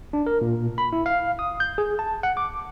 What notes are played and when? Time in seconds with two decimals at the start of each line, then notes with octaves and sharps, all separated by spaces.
0.13 D4
0.26 A#4
0.41 A#2
0.78 B5
0.93 E4
1.06 F5
1.39 D#6
1.60 G6
1.78 G#4
1.99 A5
2.23 F#5
2.37 D6